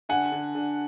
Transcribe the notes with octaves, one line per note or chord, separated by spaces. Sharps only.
D3 F#5 G#5
D3
D3